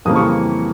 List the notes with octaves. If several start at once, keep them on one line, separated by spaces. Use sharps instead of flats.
F2 C#3 E3 G3 A#3 D#6
C#6